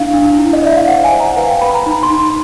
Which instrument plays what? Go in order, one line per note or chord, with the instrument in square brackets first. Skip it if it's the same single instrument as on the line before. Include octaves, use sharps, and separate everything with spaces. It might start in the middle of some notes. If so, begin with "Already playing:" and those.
Already playing: [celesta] D4 E4 F5
D4
E4
D#5
D5 E5
F5
C5 F#5
G#5
C5
A#5
B4 F5
G5
B4 B5
A#5
D#4 B5
C6
D#4
C6